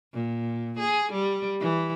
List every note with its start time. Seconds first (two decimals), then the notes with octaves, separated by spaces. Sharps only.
0.13 A#2
0.79 G#4
1.13 G3
1.60 E3